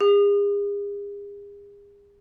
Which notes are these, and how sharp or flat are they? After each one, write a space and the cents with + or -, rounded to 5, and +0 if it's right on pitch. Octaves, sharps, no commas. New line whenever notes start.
G#4 -40